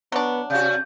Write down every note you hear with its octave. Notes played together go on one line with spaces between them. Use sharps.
F#3 B3 D4
C3 F#4 D5 G6